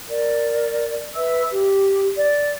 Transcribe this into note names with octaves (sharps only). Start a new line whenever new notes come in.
A#4 D5
B4 E5 E6
G4
D5